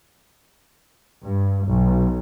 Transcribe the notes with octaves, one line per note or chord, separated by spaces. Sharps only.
G2
B1